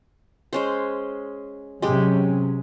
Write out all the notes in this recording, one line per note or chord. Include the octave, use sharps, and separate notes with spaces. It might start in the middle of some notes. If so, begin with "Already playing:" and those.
G#3 C#4 C5
C3 F#3 G#3 C#4 G4